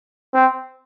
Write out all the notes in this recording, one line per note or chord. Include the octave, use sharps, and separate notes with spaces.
C4